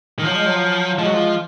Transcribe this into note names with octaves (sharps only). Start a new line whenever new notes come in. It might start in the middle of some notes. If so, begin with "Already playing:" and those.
D#3
F3 F#3
G#3
F#3
F3 G#3
F#3
F3